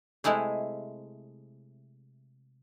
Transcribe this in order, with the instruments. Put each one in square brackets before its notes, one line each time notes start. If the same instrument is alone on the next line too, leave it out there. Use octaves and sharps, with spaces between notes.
[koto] C3 G#3 A3 E4 G#4